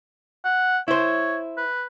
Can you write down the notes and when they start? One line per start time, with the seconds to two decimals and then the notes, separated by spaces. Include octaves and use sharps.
0.45 F#5
0.88 E4 C5 C#5
1.57 B4